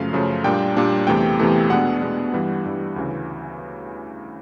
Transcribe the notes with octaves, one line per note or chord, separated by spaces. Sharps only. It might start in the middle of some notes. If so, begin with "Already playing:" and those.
Already playing: F#2 C#3 F3 A3 F5
F#2 C#3 F3 A3
A#2 G3 A#3 D4 G5
A#2 G3 A#3 D4
E2 C3 E3 A3 G5
E2 C3 E3 A3
B2 G#3 B3 D4 F#5
B2 G#3 B3 D4
G2 E3 G3
G2 E3 G3
D2 C#3 E3